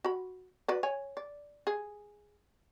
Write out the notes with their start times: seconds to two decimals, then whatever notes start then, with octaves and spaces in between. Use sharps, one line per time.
0.05 F#4 B5
0.68 F#4 B4 D5
0.83 C#5 G#5
1.17 D5
1.67 G#4